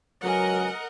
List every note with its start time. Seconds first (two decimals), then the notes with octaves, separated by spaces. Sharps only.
0.24 C#2 F#3 A#4 B4 D#5 F#5 G#5